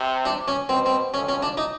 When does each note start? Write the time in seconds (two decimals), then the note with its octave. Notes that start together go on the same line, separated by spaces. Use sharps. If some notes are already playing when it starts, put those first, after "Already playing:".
Already playing: C3
0.25 D4
0.48 C#4
0.69 B2 C4
0.86 C4
1.13 F2 C#4
1.29 C#4
1.43 D4
1.57 D#4